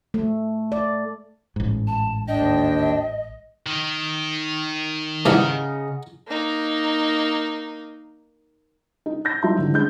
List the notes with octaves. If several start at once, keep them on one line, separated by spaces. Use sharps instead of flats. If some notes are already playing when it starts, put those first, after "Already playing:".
A3
D5
A1 G#2
A5
D#2 D4 D#5 G5
D#3
G#2 C#3 E3 G3 D#4 F#5
A#3 D#4
D#4
G6 A#6
F#3 D#4 F4 E5 C6
D3 E3 G3
G#3 C#4 D4 G6